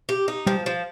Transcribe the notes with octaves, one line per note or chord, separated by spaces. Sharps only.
G4
D#4
F3 G3 G4
F3